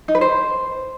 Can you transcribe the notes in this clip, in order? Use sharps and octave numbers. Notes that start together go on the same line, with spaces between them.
D#4
B4
C5